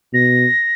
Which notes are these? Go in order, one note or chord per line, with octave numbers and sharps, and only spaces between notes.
B2 A#6